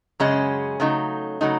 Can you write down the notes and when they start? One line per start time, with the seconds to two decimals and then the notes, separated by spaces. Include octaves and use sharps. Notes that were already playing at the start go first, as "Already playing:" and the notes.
0.20 F#2 C#3 G#3 C#4
0.80 C#3 F#3 A3 D#4
1.41 C#3 F#3 A3 D#4